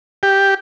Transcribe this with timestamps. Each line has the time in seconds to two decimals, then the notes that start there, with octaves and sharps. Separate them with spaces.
0.23 G4